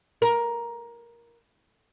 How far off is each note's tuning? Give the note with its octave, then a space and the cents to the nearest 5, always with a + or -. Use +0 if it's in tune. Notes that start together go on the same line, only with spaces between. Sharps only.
A#4 +10